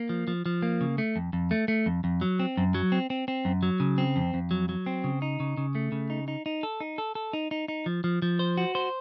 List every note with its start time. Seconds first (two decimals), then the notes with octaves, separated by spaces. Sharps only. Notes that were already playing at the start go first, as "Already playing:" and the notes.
Already playing: A#3
0.09 F3
0.28 F3
0.46 F3
0.62 A#3
0.81 C#3
0.98 A3
1.16 F2
1.33 F2
1.51 A3
1.68 A3
1.86 F2
2.04 F2
2.21 F#3
2.39 C4
2.57 F#2
2.75 F#3
2.92 C4
3.10 C4
3.28 C4
3.45 F#2
3.63 F#3
3.80 C#3
3.98 C4
4.16 F2
4.34 F2
4.51 F#3
4.69 F#3
4.86 C4
5.04 C#3
5.22 D#4
5.40 C#3
5.57 C#3
5.75 A3
5.92 C#3
6.10 D#4
6.28 D#4
6.46 D#4
6.63 A4
6.80 D#4
6.98 A4
7.15 A4
7.33 D#4
7.51 D#4
7.68 D#4
7.86 F3
8.04 F3
8.22 F3
8.39 C5
8.57 F#4
8.75 C5